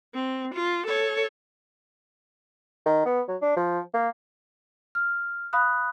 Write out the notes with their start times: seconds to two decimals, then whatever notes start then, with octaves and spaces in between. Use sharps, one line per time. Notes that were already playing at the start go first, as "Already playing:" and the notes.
0.14 C4
0.55 F4
0.87 A4 C#5
2.85 D#3
3.06 B3
3.28 F#3
3.42 D4
3.56 F3
3.94 A#3
4.95 F6
5.53 F5 B5 D#6 F#6